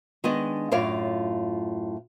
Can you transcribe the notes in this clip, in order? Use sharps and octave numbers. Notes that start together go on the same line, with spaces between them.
D#3 G#3 B3 D4 D5 D#5
F#2 A2 F4 C#5 D5 F5